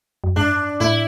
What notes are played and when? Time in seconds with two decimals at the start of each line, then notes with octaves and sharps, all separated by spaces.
0.24 F#2
0.36 G#2 D4
0.80 A2 E4